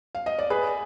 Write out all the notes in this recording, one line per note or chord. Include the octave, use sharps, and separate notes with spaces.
F5
D#5
D5
G#4 B4